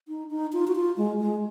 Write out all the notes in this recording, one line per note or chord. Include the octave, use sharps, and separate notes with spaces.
D#4
D#4
F4
F#4
F4
G#3
G#3